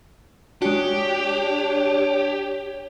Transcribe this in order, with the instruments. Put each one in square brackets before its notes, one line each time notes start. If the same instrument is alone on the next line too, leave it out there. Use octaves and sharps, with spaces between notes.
[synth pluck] G#3 F#4 [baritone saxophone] D4 [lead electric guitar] G4 [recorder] C#5